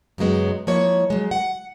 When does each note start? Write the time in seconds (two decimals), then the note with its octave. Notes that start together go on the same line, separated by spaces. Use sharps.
0.18 F#2 C#3 F#3 G#3 B3
0.67 F3 G#3 A#3 E4 C#5
1.10 F#3 G#3
1.31 F#5